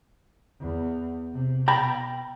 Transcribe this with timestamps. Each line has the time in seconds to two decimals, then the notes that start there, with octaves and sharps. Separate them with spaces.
0.60 E2
1.33 C3
1.68 B2 G5 A#5 B5